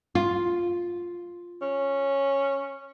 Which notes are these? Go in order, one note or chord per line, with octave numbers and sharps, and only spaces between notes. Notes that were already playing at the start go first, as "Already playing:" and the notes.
F4
C#4